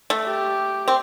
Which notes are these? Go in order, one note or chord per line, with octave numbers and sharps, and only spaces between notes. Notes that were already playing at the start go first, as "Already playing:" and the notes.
A3
G4
C4